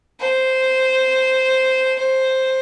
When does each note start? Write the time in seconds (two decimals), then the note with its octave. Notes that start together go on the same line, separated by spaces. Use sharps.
0.21 C5
1.99 C5